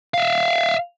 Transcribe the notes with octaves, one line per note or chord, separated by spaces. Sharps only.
E5 F5